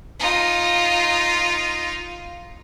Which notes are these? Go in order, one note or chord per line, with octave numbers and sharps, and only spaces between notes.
D#4 F4